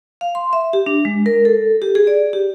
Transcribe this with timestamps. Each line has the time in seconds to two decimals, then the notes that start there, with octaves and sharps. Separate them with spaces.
0.21 F5
0.35 C6
0.53 E5
0.73 G4
0.86 D4
1.05 G#3
1.26 A#4
1.45 A4
1.82 G4
1.95 G#4
2.07 D5
2.33 G4